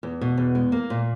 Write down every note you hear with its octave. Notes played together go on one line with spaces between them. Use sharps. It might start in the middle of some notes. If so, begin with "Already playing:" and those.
E2
B2
E2
G#3
A#3
A#2